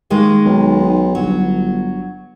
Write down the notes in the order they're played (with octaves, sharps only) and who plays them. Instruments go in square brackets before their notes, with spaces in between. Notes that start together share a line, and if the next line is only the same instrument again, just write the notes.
[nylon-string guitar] D#3 G#3 A#3
[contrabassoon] B1
[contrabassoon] G1 [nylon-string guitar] F#3